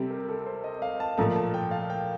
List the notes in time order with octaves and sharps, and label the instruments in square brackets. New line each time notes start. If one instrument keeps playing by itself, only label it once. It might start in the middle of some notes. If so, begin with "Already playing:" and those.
Already playing: [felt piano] C3 G3 C4 G4 [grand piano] A4
[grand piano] A#4
A4
C5
D#5
F5
A5
[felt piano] A#2 F3 A3 [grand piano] A#5
[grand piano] A5
G5
F5
G5